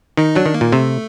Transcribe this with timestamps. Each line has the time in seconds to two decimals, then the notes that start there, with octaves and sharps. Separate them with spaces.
0.17 D#3 D#4
0.35 F#3 D4
0.46 D#3
0.54 A#3
0.61 A#2
0.72 C3 A3